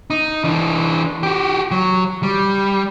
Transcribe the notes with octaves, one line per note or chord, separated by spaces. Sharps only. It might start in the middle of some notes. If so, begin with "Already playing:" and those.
D#4
E3 D4
F#4 G4
F#3
G3